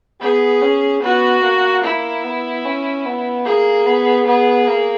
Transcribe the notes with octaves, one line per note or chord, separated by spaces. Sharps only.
B3 G#4
C#4
B3 F#4
A#3
E4
B3
C#4
B3
A#3 G#4
B3
B3 G#4
A#3